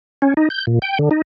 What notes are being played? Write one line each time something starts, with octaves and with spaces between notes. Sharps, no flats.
C#4
D#4
G6
A#2
G5
D3
D#4